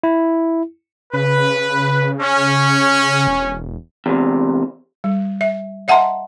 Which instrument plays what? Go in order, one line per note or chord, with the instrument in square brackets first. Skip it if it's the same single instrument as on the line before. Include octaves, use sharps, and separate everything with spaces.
[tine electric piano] E4
[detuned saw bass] C#3 [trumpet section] B4
[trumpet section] C#4
[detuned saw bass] E1
[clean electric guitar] E2 C3
[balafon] G3
E5
D#5 E5 F#5 A5 A#5 C6